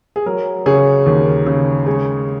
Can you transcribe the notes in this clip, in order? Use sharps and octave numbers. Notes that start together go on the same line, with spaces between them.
G#4
F#3 A#4
C#3 G#4 C#5
D#2
C#3
G#3 G#4 C#5